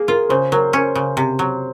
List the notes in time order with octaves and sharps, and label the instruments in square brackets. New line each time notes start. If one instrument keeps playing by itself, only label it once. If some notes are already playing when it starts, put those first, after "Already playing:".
Already playing: [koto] A#3 [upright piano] G#4
[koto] F4 [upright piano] A#4
[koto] C#3 [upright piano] C5
[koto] F#3 [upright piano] A#4
[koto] C#4 [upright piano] A#4
[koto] C#3
C3
F#3